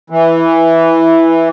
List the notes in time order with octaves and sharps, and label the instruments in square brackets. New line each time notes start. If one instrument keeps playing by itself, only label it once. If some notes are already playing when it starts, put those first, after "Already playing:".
[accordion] E3